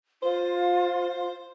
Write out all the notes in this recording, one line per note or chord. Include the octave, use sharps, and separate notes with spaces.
F4 C5